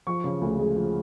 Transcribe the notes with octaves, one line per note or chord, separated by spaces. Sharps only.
F3 C#6
C#3
D2
G#3
F3